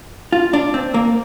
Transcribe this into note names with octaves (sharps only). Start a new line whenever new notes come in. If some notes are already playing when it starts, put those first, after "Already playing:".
F4
D4
C4
A#3